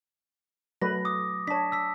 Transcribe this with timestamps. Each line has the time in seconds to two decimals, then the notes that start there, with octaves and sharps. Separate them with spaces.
0.82 F#3 A3 B4 A#6
1.05 D6 D#6
1.48 D4 C#5 A5 B6
1.72 E6 B6